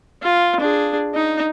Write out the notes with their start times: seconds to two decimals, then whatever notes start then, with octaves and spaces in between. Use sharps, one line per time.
0.22 F4
0.60 D4 G#4
1.15 D#4